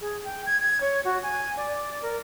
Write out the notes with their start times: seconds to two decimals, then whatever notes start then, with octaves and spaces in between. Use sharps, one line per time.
0.01 G#4
0.24 G5
0.46 G#6
0.60 G#6
0.81 C#5
1.05 F#4
1.23 G#5
1.57 D5
2.02 A#4